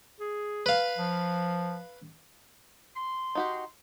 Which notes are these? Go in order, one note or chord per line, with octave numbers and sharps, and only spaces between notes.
G#4
B4 F5
F3
C6
D#4 F#4 G4